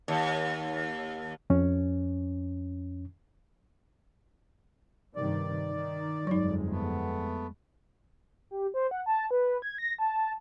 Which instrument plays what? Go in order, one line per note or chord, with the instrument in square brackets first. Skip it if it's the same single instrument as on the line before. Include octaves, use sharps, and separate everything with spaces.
[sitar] D#2
[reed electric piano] F2 C#4
[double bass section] G2 C3 D#3 [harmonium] D5
[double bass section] D#3
[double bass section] G1 F2 G#3 [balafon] F#3 D#4
[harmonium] A3 B3
[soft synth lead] G4
C5
F#5
A5
B4
G#6
A#6
A5